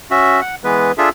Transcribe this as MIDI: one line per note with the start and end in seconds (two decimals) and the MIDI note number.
0.11 0.41 61
0.11 0.41 66
0.11 0.41 76
0.41 0.55 78
0.64 0.92 52
0.64 0.92 56
0.64 0.92 59
0.64 0.92 71
0.98 1.09 62
0.98 1.09 65
0.98 1.09 68
0.98 1.09 69
0.98 1.09 76